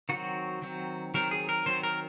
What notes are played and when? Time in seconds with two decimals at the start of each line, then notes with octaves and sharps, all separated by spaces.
0.09 D#3 F#3 C4 F#4
0.62 D#3 F#3 C4
1.14 D#3 F#3 C4 A#4
1.31 G#4
1.49 A#4
1.66 D#3 F#3 C4 C5
1.83 A#4